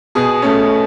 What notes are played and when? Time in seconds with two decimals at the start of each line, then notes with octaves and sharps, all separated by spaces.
0.15 B2 G#4
0.42 A3 C#4